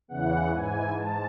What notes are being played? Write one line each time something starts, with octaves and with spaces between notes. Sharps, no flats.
E2 C#3 E3 F#5
G#2 E3 G#5
G#2 A5